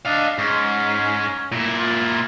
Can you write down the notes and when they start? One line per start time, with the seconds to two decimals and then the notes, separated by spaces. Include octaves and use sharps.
0.06 D4 D#5 F5
0.39 G#2 C#4
1.52 A#2 E4
1.78 F4